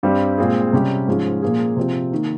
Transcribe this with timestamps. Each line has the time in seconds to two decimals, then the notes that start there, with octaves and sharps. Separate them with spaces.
0.03 G2 G3 C4 G4
0.38 A#2 G#3 C4 F4 G#4
0.73 C3 G3 C#4 G4
1.08 G#2 F3 G#3 C#4
1.42 A#2 F3 A#3 F4 G#4
1.77 C3 F3 C4
2.12 D#3 A#3